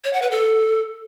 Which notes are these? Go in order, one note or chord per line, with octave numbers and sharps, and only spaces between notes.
C#5
F#5
B4
A4